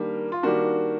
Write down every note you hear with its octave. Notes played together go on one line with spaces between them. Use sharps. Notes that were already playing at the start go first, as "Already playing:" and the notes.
Already playing: D#3 G3 A#3 D4
F4
D#3 G3 A#3 D4 F#4